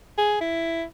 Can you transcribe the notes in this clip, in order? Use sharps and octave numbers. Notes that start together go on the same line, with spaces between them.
G#4
E4